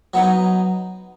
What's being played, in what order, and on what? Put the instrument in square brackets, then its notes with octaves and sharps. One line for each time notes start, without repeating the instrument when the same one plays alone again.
[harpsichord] F#3 B3 D#4